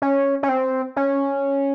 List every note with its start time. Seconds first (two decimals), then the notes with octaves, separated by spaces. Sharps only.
0.02 C#4
0.43 C#4
0.49 C4
0.96 C#4